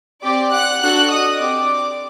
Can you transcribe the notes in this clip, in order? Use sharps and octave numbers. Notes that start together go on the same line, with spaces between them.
C4 G4 D5 D6
F#5 F#6
D4 F#4 A4 F#5 F#6
D#5 D#6
C4 G4 D5 D6